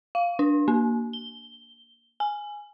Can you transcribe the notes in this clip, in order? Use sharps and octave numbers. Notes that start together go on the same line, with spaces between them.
F5
D4
A#3
G7
G#5